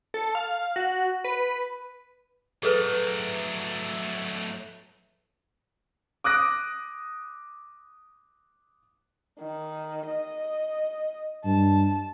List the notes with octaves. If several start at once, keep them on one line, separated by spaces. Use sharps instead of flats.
A4
F5
F#4
B4
F#3 A3 G#4 A4 B4
D6 D#6 F#6 A#6 D7
D#3
D#5
G2 A5